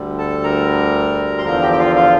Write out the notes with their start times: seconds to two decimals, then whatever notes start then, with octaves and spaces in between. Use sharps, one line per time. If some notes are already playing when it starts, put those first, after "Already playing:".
Already playing: D2 D3 G3
0.18 A4 A5
0.43 A#4 A#5
1.38 C6
1.45 E2 D3 F3 A#4 A#5
1.62 G4 G5
1.73 G5
1.79 F4 F5
1.96 F4 F5